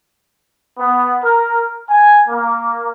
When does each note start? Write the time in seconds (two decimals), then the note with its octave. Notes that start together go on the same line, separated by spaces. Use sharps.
0.78 B3
1.23 A#4
1.89 G#5
2.29 A#3